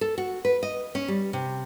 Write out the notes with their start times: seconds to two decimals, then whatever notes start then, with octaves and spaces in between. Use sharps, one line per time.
0.01 A4
0.18 F#4
0.45 B4
0.63 D#5
0.95 C#4
1.08 G3
1.33 C3